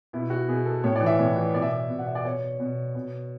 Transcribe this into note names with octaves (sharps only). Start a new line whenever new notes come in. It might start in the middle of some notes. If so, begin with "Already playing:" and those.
B2 E4
F#4
B2 G#4
A4
A2 C#5
D5
E3
E5
A2
E3
B2 D5
E5
D5
B2
F#5
E5
D5
B2 C#5
B2
B2